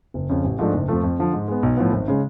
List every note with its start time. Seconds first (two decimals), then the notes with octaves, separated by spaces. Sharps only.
0.14 F#1
0.29 F2 C#3
0.44 A1
0.59 G#2 F3 A3 D4
0.73 F#1
0.88 F2 F3 A3
1.03 F2
1.18 D3 F3
1.33 G#2
1.48 G#3 B3
1.63 B1
1.77 A2 F3 B3
1.92 G#1
2.08 C#3 G#3